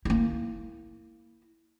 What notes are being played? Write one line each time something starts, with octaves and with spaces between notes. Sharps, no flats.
A#3 E4